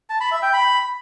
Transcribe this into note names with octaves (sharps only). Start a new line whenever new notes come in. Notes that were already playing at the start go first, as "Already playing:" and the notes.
A5
B5
E5
G5
B5